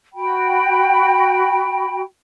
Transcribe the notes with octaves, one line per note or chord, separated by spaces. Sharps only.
F#4 G5 B5